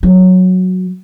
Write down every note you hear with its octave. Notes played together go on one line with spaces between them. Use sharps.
F#3